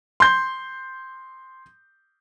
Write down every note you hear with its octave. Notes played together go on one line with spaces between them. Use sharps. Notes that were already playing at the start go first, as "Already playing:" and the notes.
C6 G6